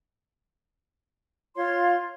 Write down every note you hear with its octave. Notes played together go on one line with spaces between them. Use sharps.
F4 C#5 C6